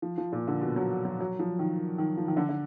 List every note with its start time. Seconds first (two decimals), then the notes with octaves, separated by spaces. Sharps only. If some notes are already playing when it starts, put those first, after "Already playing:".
0.02 F3
0.18 F3
0.32 A#2
0.47 D3
0.61 B2
0.76 F#3
1.05 F#3
1.20 F#3
1.39 F3
1.59 D#3
1.98 D#3
2.17 F3
2.28 D#3
2.37 D3
2.49 D3